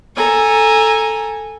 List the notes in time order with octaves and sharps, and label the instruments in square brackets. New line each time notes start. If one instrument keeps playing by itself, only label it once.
[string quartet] A4 G#5 A#5